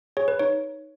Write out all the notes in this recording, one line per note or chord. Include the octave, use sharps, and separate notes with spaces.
G#4 C#5
B4
D#4 C#5